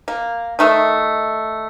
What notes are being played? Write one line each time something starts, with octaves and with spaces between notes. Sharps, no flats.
A#3
D#3 A3 E5